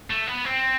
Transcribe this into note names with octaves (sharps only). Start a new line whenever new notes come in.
A3
B3
C4